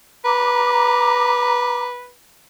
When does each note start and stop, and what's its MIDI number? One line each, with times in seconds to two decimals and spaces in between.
0.25 2.11 71
0.25 1.86 82
0.25 1.86 86